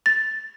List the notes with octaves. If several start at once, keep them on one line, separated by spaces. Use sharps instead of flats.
A6